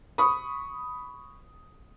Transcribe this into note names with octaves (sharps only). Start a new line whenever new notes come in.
B5 C#6 D#6